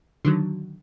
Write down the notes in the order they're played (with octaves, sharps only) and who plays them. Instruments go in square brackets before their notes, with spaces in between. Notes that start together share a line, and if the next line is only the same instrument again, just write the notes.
[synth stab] D3 D#3 F#3